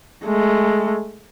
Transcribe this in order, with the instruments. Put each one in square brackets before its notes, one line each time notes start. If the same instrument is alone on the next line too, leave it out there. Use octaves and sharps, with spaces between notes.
[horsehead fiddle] G#3 A3